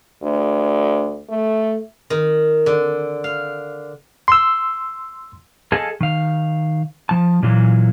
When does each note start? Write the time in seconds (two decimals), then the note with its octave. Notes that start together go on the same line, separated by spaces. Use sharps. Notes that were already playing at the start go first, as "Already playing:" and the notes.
0.22 D2
1.29 A3
2.10 D#3
2.66 D3
3.24 F5
4.28 C6 E6
5.72 G#4 A4 D#5 F5 G#5 A5
6.01 D#3 F5
7.09 F3 A5
7.43 A#2 E3 F#3 F4